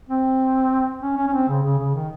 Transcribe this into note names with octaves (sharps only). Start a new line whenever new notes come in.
C4
C#4
C#4
C#4
C4
C#3
C#3
C#3
D#3